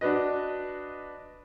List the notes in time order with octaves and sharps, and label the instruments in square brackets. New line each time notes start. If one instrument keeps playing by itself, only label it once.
[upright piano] D4 F#4 B4 D#5